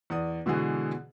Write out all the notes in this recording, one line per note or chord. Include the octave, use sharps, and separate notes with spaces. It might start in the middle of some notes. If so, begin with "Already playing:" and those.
E2 D5 D#6
B2 D3 E3 G#3 F#4 G#4